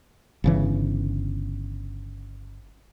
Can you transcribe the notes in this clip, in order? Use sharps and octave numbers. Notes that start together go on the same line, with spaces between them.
G1 C#3 E3